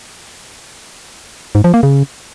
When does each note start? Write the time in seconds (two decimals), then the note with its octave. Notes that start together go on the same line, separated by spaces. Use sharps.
1.55 G#2
1.64 F3
1.74 A#3
1.83 C#3